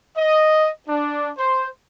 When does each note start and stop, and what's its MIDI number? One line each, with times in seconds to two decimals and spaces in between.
0.17 0.68 75
0.89 1.30 62
1.38 1.68 72